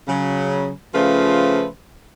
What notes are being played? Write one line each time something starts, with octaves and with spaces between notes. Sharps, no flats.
C#3 F#3
C#3 F3 A3 F4 B4 C5